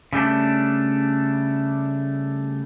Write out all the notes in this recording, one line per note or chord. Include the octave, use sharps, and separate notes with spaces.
C#3 G3 A3 D4